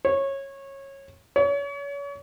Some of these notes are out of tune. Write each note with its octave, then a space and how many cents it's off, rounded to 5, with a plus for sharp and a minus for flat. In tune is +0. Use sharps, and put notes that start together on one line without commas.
C#5 -20
C#5 +35